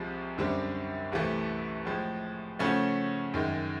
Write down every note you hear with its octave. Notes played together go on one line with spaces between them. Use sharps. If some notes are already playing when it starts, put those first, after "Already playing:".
Already playing: C2 C3 F3 G#3 C4
F#2 D3 G3 C4
C2 C3 E3 A3
A2 F3 G#3
C#3 F3 A3 C#4 F#4
F#2 D#3 G#3